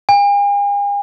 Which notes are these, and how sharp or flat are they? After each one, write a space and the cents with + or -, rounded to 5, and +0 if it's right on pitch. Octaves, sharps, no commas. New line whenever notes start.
G#5 -45